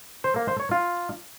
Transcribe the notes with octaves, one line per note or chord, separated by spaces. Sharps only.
C5
A#3
C5
C#5
F4